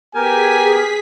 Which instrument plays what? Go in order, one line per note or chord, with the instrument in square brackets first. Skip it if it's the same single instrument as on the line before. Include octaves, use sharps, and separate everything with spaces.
[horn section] B3 G4 [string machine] G#4 B6 [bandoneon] A#4 [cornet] G#5